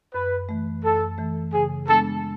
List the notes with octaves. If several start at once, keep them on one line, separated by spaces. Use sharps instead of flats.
F#2 B4
E3 A3
F#2 A4
E3 A3
C#3 G#4
G#3 B3 D4 A4